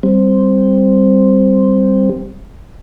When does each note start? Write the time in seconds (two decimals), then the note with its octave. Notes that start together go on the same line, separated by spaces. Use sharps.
0.03 G3 C4